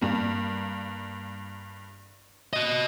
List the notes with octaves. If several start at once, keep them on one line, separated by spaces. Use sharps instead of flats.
G2 A#3
F#4 D#5